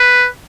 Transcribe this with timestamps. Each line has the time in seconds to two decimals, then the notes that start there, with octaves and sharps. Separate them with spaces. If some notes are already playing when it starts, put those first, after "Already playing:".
Already playing: B4